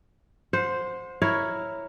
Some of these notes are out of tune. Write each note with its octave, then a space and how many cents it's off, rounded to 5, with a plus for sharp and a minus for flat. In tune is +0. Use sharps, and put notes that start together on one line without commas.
C5 +0 F#5 -40
E4 +0 A#4 +0 C#5 +0